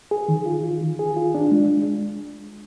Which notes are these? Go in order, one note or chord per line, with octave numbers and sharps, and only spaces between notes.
G#4
D#3
F4
F4
D#3
G#4
F4
D4
G#3